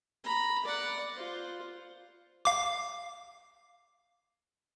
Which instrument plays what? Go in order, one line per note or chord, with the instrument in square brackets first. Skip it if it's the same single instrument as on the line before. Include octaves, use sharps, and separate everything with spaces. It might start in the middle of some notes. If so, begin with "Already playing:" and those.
[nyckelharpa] A#5 B5
D5 F#5
F4 C5
[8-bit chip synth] F5 D6